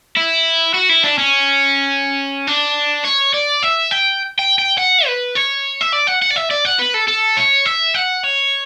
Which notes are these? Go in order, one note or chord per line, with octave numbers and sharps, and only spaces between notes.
E4
F#4
E4
D4
C#4
D4
C#5
D5
E5
G5
G5
G5
F#5
B4
C#5
E5
D5
F#5
F#5
D5
E5
D5
F#5
B4
A4
A4
C#5
E5
F#5
C#5